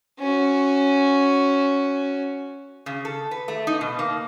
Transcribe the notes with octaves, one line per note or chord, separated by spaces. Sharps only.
C#4 F#4
C#3
A4
B4
A3
D#4
B2
A#3